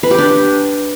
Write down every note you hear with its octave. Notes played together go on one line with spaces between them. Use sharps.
B4
G4
D4